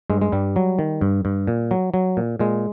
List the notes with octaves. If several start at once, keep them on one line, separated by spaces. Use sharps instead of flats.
G2 G#3
G#3
G2 G3
F#3
D#3
G2
G2
A#2
F#3
F#3
A#2
A#2 G#3